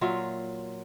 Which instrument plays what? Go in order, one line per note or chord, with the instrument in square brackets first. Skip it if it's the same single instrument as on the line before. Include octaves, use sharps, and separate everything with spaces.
[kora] A#2 F#3 F4 E5